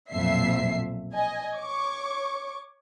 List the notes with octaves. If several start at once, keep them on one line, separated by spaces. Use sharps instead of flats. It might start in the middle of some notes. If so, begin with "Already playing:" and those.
B1 F2 A#2 F#3 E5 C7
D#5 G#5
C#5 C#6 D6